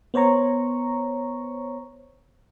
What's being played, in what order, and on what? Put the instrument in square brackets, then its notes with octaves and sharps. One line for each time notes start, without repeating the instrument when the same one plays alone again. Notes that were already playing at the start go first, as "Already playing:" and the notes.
[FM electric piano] B3 C5 C#5 A#5 C#6